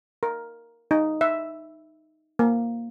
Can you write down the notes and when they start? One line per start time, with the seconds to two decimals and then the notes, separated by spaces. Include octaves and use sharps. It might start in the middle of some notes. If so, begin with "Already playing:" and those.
0.23 A#4
0.91 D#4
1.21 E5
2.39 A#3